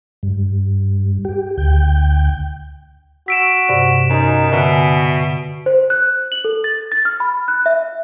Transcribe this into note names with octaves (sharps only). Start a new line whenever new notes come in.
G2
G4
D2 G5
F#4 E6 B6 D7 E7
G2 C3 D5
F#2 D#4
B2 D3 F#4 E5 G#5
C5
F#6
F#7
A4
A6
A6
F6
B5
F#6
E5